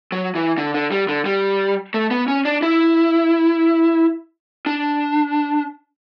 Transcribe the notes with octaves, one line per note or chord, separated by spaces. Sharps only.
F#3
E3
D3
D3
G3
D3
G3
A3
B3
C#4
D4
E4
D4